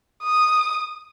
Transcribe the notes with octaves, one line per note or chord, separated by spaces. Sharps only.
D#6